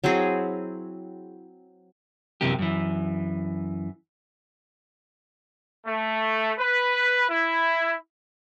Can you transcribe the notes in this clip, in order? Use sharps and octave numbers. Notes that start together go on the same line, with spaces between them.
F#3 C4 E4 G#4
F#2 C3 E3 A#3 G4
F#2 E3
A3
B4
E4